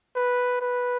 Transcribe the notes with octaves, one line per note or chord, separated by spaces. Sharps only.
B4
B4